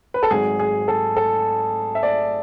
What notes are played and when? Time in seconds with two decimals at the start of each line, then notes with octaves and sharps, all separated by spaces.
0.14 B4
0.23 A4
0.31 G#1 G#2 F#3 G#4
0.59 G#4
0.88 A4
1.17 A4
1.95 E5
2.03 D5